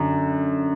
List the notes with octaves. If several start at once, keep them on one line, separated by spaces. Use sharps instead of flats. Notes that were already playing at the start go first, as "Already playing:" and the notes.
Already playing: F#2 D3